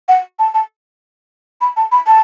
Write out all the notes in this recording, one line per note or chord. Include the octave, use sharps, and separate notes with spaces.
F#5
A5
A5
B5
A5
B5
A5